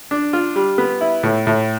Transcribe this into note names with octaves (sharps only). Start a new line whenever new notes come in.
D4
F4
G3
B3
E4
A2
A2